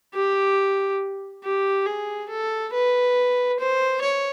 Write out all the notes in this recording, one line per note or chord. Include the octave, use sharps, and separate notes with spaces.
G4
G4
G#4
A4
B4
C5
C#5